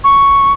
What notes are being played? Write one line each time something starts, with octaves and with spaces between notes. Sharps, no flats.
C#6